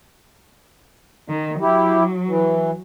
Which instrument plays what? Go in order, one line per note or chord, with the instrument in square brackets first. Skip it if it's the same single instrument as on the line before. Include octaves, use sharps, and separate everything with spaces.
[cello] D#3
[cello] F#3 [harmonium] E4 G4
[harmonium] E3